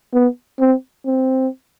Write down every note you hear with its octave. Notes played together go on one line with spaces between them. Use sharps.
B3
C4
C4